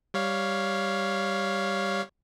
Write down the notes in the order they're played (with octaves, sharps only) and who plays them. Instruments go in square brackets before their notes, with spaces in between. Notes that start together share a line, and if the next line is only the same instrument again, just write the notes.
[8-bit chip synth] G3 C#5 F5